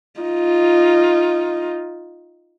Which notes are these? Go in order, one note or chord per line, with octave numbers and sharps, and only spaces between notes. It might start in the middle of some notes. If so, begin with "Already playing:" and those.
D#4 F4